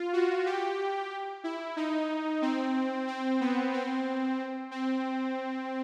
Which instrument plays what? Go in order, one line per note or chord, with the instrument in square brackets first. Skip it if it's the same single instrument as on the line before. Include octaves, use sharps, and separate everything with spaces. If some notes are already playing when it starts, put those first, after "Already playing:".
Already playing: [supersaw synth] F4
F#4
G4
E4
D#4
C4
C4
B3
C4
C4